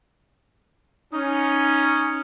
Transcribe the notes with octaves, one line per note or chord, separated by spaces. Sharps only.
C#4 D#4